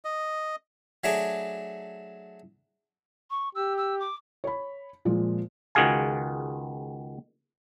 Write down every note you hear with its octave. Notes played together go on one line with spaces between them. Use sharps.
D#5
F#3 A3 D4 G#4 A#5 D6
C#6
G4 E6
E6
D6
C#5 B5
A#2 F3 G#3
C#2 D#3 F#4 G#4 F5 G#5